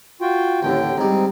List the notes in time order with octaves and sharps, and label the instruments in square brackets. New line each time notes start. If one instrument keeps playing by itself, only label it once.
[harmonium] F4 F#4 G5
[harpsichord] A1 D#2 A2 [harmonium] D3 G5
[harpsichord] G#2 G3 [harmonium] C4 D#4